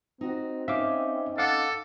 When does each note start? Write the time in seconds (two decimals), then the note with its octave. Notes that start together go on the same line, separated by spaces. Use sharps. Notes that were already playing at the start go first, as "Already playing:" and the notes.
0.21 C4 D#4 F#4
0.68 C#4 D#4 C#5 E5 F5 D6
1.38 A4 F5 F#5 D6